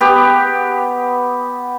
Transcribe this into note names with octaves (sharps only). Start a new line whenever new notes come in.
B3 G4